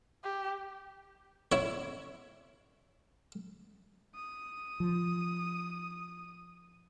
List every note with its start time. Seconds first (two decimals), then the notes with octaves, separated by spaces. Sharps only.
0.23 G4
1.52 E4 C#5
4.15 D#6
4.80 F3